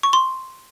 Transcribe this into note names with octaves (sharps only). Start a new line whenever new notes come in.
C#6
C6